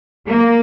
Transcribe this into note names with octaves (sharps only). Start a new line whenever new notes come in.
A#3